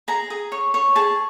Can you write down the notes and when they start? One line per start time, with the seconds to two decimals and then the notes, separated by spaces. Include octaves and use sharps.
0.08 G#4 A#5
0.30 G#4
0.52 C#5
0.74 C#5
0.95 G#4 A5